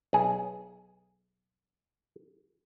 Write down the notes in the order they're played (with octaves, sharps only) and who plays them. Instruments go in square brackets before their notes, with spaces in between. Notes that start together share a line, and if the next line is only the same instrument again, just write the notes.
[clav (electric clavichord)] B1 G#4